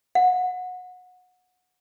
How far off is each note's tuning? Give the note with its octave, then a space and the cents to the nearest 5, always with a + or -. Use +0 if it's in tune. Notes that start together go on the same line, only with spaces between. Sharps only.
F#5 -20